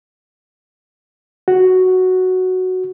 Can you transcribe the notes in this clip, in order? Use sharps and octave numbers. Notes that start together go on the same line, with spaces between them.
F#4